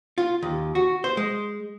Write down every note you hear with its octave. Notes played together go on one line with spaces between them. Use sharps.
F4
D#2
F#4
C5
G#3